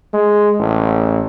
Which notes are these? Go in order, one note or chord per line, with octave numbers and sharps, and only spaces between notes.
G#3
A1